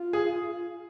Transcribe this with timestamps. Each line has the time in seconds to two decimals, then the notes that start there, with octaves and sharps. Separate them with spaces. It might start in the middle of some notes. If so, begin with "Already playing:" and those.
Already playing: F4
0.13 G#4